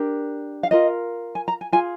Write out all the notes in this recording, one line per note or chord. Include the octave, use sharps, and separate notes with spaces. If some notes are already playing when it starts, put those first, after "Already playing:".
Already playing: D4 G4 A#4
F5
F4 A#4 D#5
G#5
A#5
G#5
F4 G#4 G#5